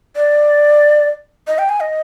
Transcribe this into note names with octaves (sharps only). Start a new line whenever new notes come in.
D5
D#5
G5
G#5
D#5